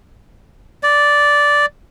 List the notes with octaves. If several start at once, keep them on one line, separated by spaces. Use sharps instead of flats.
D5